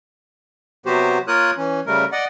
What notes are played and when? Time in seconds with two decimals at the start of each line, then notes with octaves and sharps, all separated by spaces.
0.86 C3 F#3 B3 F#4 G4 C5
1.28 A#3 F4 A#4 C#5 D#6 F#6
1.57 E3 C#4
1.87 C#3 G3 A3 A#4
2.12 D5 D#5 F#5